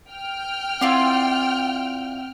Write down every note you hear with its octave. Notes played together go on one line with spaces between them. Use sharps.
G5 F6
C4 E4 F4 D5 F#5